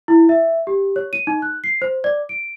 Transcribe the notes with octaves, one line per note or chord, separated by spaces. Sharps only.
E4
E5
G4
C#5
D#7
D#4
F#6
C7
C5
D5
D7